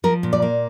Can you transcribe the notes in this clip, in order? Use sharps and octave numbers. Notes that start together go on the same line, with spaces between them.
F3 A#4
A#2
D5
A#3